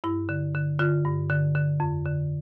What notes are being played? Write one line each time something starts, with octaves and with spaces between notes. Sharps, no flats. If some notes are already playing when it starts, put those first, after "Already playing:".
G2 E4
D3
D3
D3 F4
G2
D3
D3
F2
D3